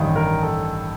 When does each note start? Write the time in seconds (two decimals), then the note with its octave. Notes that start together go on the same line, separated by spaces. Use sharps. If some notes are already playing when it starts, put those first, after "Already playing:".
Already playing: A1 G2 D#3
0.16 A#4
0.43 A4